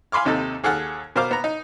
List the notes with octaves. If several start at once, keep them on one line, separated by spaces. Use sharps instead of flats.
F5 G#5 B5 C6 D6 F6
D#2 C3 D#4 A4
D#2 G#4 A4 F#5 F6
B2 A#4 C5 F5 D6
B3 A#5
D#4